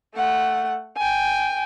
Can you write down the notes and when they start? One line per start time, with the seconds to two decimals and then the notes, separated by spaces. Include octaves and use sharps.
0.15 A3 F#5
0.97 G5 G#5